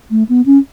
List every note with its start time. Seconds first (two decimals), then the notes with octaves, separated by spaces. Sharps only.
0.11 A3
0.29 B3
0.46 C#4